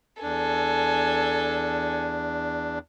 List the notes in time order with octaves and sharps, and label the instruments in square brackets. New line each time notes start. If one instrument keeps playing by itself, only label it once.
[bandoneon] E2 D4 [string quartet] A4 G#5